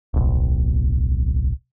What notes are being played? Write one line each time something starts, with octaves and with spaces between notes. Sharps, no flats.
D1 B1